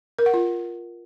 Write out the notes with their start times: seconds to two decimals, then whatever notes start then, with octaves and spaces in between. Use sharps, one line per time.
0.19 A#4
0.26 F#5
0.34 F4